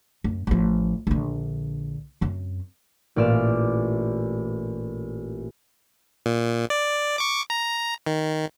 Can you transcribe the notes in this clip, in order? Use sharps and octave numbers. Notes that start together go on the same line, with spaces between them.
F#2
A1 F3
A#1 D3
F#2 C4
A1 A#2 D5 F6 E7
A#2
D5
C#6 D6
A#5
D#3